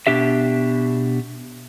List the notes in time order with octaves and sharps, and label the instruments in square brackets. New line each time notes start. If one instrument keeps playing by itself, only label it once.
[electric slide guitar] B2 D4 G4 E5